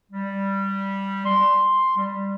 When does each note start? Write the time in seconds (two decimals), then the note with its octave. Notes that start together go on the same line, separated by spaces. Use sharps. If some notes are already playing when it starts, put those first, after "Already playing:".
0.12 G3
1.25 C6
1.97 G3